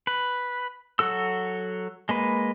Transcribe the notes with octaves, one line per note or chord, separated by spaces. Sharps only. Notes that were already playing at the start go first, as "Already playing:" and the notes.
B4
F#3 F#4 A4 E6
G#3 A#3 B4